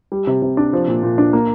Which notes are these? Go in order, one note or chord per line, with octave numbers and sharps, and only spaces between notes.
G3
C3
C3
D4
F3
A#2
A#2
D4
A#3